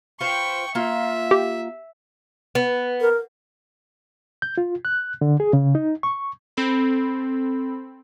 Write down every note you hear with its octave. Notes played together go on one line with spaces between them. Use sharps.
F4 B4 C5 G5 C#6
A#3 F4 E5
G4
B3
A#4
G6
F4
F#6
D3
G#4
C#3
D#4
C#6
C4 A4 B5